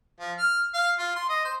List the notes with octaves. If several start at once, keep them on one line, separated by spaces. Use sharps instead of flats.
F3
F6
F5
F4
C6
D#5
C5